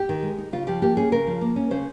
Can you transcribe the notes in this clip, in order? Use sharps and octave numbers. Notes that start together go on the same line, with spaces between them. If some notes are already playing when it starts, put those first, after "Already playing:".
Already playing: G4
D#3
G#3
D#4
C#3 F4
F3 G4
A#3 G4
C#4 G#4
C#3 A#4
F3
A#3
C#4
C#3 C5